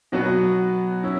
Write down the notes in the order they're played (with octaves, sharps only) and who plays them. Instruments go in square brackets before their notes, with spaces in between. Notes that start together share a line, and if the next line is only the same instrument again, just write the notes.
[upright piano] B2 F#3 B3 F#4 B4
C#4 E4